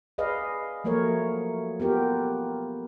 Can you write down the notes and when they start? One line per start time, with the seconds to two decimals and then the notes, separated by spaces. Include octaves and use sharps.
0.18 G#4 B4 D5 D#5 F5
0.84 F3 F#3 A3 A#3 A#4 C#5
1.80 B3 F4 G4 A#4